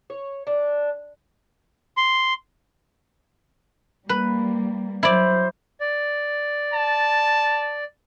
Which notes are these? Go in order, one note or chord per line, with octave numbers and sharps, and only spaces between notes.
C#5
D4
C6
G3 A#3 B4
F#3 E4 C5 D5
D5
A5